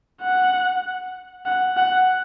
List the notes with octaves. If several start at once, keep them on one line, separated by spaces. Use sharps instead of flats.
F#5
F#5
F#5